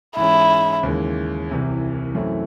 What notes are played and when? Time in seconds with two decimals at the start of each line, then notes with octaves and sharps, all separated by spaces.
0.16 G#2 E3 G#3 C#4 E4
0.83 D#2 C#3 E3 G#3
1.49 C2 C3 E3
2.15 F#2 E3 A3 C4 E4